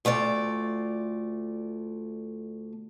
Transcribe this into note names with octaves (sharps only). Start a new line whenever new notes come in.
D2 A3 F4 D5